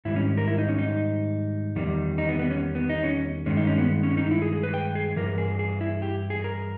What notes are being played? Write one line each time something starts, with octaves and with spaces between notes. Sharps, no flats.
G#2 D#3 G3 E4
C#4
A#4
E4
D#4
C#4
D#4
E2 D#3 G3
D#4
B3
B3
C#4
B3
D#4
C#4
G2 D#3 G#3 C#4
D#4
C#4
B3
C#4
D#4
E4
G#4
G#4
B4
G5
G#4
G2 E3 A#4
G#4
G#4
E4
G4
G#4
A#4